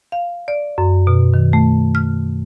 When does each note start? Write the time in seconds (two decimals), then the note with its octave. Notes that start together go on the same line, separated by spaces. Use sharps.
0.12 F5
0.48 D5
0.78 F#2
1.07 B2
1.34 D#3
1.53 A3
1.95 F6